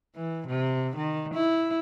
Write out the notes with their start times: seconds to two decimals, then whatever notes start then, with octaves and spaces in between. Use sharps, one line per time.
0.15 E3
0.47 C3
0.96 D#3
1.34 E4